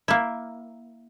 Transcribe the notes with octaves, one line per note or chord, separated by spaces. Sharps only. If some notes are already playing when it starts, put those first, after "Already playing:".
A#3 E4